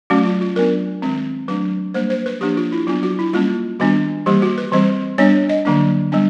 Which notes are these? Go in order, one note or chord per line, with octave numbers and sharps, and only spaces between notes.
F#3 A3 C#4 F#4
F4
F4
F#3 B3 D4 A#4
D#3 G#3 C4
F#3 A3 D4 B4
G3 A#3 D4 C5
C5
B4
F3 A#3 D4 G4
F4
E4
F#3 B3 D4 F4
F#4
E4
G3 A#3 C#4 F4
D#3 G3 B3 D4 F#4
E3 G3 A#3 G4
F#4
B4
E3 G3 C4 C5
G3 B3 D4 C#5
D#5
D3 F#3 A#3 D4
G3 B3 D4